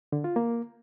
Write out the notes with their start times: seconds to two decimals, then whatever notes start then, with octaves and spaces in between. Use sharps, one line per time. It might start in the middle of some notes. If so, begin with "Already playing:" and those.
0.12 D3
0.24 F4
0.36 A#3